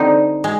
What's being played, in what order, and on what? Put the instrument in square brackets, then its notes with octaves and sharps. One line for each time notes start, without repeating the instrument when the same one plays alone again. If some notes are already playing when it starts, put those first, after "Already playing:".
Already playing: [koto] D3 G3 C4 D#4
G#3